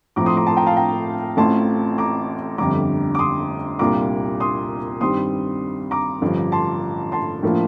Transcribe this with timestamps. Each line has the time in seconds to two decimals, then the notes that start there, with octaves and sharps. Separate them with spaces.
0.16 A2 F3 C4 A#5 D6
0.26 C6 D#6
0.36 A#5 D6
0.47 A5 C6
0.56 G5 A#5
0.66 F5 A5
0.77 G5 A#5
1.37 A1 A2 A3 C4 F4 A5 C6
1.98 A#5 D6
2.58 G1 F2 D3 G3 A#5 D6
3.15 D6
3.19 C6 D#6
3.79 C2 A#2 G3 D4 F4 A#5 D6
4.40 C6 D#6
5.01 G2 D#3 G3 C4 C6 D#6
5.91 A#5 D6
6.22 A1 G2 D3 F3
6.52 A5 C6
7.12 A5 C6
7.43 A2 F3 A#3 D4 F4